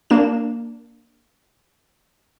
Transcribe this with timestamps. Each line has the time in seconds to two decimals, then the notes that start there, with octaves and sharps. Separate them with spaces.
0.10 A#3 D4 E7